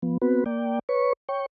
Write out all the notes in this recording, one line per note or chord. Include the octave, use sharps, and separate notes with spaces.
F3 B3
B3 C4 F#4 B4
A#3 D5 G5
B4 C#5 C#6
C#5 G5 C#6